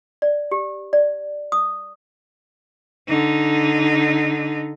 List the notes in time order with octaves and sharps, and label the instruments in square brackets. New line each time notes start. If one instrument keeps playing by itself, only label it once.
[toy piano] D5
G4
D5
D#6
[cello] D3 D#4